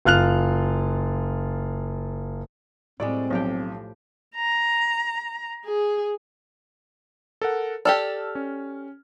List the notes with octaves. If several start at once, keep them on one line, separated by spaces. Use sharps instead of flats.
F#1 F4 F6 F#6 F7
A2 G3 G#3 C4 D5
B1 F3 G4 G5
A#5
G#4
A4 A#4 F#5
G4 A4 D5 A5 E6 F6
C#4